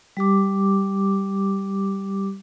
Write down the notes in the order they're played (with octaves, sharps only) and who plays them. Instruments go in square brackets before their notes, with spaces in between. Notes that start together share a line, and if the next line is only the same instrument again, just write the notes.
[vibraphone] G3 G4 D6